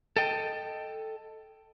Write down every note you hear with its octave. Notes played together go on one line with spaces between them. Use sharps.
A4 D#5 G5